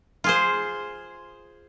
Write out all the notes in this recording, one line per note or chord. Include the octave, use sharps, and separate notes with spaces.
F4 G#4 C5